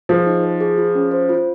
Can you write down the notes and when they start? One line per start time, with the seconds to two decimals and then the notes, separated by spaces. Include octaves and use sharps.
0.09 F3 G#4
0.26 D#4
0.43 C5
0.61 G#4
0.78 F4
0.95 C#4
1.11 C5
1.29 F4